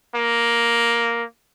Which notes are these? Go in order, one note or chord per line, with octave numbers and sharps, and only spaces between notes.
A#3